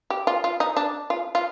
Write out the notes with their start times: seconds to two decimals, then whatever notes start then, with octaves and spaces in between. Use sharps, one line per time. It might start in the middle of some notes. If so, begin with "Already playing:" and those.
0.10 G4
0.27 F4
0.44 F4
0.60 D#4
0.76 D4
1.10 F4
1.35 F4